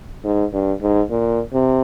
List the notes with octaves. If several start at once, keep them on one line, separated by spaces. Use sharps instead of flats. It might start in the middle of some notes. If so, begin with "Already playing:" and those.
G#2
G2
G#2
A#2
C3